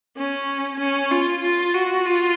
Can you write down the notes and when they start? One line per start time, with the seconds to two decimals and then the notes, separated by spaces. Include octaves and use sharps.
0.17 C#4
0.80 C#4
1.11 F4
1.42 F4
1.74 F#4
2.05 F4